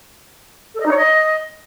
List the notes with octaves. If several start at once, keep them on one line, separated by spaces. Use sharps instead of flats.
A4
D#5
D#4
C#5
D#5